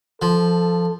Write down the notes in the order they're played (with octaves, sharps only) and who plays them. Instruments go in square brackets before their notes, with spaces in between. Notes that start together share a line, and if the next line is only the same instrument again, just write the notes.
[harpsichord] F3 [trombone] A4